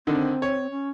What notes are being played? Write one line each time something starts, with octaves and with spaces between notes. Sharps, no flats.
D3 D#3 C4
C#5
C#4